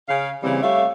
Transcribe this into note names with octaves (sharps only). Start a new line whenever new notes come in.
C#3 F5
C#3 E3 G3 A#3 C4
G3 A3 C#5 E5 F5